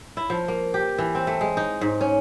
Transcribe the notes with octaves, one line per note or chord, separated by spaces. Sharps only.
E4
F3
A#3
G4
E3
C4
A3
G#3
D#4
G#2
C#4